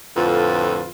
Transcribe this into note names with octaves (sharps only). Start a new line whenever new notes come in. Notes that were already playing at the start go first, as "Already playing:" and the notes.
F2 A2 D3 F4 B4